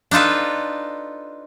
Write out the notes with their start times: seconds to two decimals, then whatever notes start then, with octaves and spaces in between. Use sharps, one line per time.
0.11 D4 D#4 F4 A4 B4